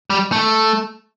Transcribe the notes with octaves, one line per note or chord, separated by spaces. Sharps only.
G3
A3